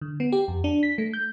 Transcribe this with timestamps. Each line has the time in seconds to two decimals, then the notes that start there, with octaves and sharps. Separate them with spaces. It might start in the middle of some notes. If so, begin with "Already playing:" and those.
0.01 D3
0.20 B3
0.32 G4
0.48 F2
0.64 D4
0.83 B6
0.98 A3
1.13 G6